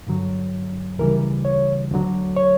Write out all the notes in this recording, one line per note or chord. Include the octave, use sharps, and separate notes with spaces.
G2 D3 F#3
D2 C#3 E3 G3 A#4
C#5
D2 D3 F#3
C#5